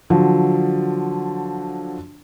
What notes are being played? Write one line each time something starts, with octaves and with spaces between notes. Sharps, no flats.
D3 F3 F#3